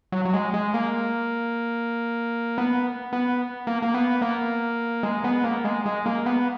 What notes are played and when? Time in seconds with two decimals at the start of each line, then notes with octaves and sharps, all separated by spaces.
0.12 F#3
0.25 F#3
0.33 G#3
0.54 G#3
0.74 A#3
2.58 B3
3.13 B3
3.67 A#3
3.82 A#3
3.94 B3
4.22 A#3
5.03 G#3
5.24 B3
5.44 A#3
5.65 G#3
5.86 G#3
6.06 A#3
6.26 B3